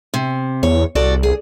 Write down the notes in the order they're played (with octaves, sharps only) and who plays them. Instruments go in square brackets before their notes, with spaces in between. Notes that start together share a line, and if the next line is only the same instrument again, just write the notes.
[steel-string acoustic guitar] C3
[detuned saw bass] E2 [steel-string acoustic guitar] C#5
[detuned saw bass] C2 [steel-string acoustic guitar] F#4 A4 D5
[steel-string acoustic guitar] G#4